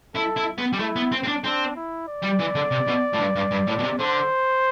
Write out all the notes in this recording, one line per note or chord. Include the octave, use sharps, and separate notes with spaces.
E4 A4
E4
B3
G3
A3 E4
B3
C4
C4
D4
C4 D4
E4
D5
G3
E3
D3
C3
B2
A2
G2
G2
G2
A2
B2
C3
D3 C5